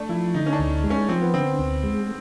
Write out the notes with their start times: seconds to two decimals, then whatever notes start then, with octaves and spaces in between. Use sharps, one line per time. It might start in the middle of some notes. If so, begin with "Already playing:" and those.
Already playing: A3 D4
0.09 F3 E4
0.34 D3 D#4
0.46 C#4
0.53 D4
0.59 D2
0.84 G#3
0.90 C#4
1.09 F3 C4
1.22 B3
1.34 D3 C4
1.59 D2
1.83 G#3